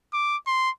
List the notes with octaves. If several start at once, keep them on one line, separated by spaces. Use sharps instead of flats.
D6
C6